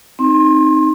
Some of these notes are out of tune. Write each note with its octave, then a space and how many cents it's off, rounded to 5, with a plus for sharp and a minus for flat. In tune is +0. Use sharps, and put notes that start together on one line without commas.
C4 +0 D#4 +0 C6 +30